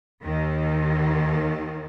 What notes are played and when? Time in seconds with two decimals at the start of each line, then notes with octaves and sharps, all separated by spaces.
0.24 D#2 D#3